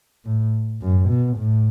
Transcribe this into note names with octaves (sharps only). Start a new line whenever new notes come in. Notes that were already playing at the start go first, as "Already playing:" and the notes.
A2
F#2
B2
A2